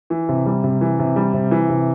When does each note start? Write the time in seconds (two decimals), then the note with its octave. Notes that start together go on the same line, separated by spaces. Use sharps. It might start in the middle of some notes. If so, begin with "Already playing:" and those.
0.10 E3
0.29 C3
0.46 G3
0.64 C3
0.81 E3
0.99 C3
1.16 G3
1.34 C3
1.51 E3
1.70 C3